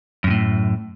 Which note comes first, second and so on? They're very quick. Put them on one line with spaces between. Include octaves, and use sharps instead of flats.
F#2 C3 A2